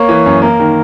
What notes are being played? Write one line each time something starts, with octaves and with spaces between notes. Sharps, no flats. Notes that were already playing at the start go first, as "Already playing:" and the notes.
Already playing: A#3 C#5
E3
F#2
A#3 A#4
D#3